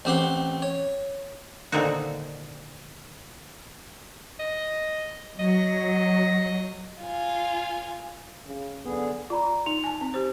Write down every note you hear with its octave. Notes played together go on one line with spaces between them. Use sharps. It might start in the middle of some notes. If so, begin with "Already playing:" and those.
A1 C4 G4 F#5 C6
C#5
A#2 D3 D#3 C4 D#4 F#4
D#5
F#3 D#5
F4 G#5
D1 C#3
B1 D3 B3 G#4
F4 D5 A#5 B5
D#4 F7
G#5 A5
C4
G4 C5